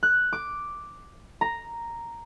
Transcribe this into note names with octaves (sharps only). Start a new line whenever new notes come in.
F#6
D6
A#5